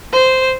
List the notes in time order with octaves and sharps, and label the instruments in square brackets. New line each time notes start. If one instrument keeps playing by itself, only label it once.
[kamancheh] C5